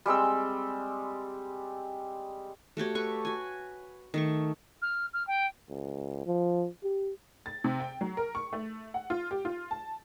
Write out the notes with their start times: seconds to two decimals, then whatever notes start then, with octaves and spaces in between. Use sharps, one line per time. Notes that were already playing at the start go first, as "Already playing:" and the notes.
0.06 G3 G#3 C4 E6
2.77 A3 F#4 G4 C#5
2.95 A4 B4 C#6
3.25 F#4 G#5
4.14 D#3 A3 C#6
4.82 F6
5.13 F6
5.27 G5
5.69 C#2
6.26 F3
6.84 G4
7.46 A6
7.64 C3
7.80 G5
8.01 F#3
8.17 A#4
8.35 C#6
8.53 A3
8.94 F#5
9.10 F4
9.31 G4
9.45 F4
9.71 A5